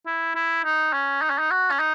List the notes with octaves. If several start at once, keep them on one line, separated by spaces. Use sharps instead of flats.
E4
E4
D#4
C#4
D#4
C#4
D#4
F#4
C#4
D#4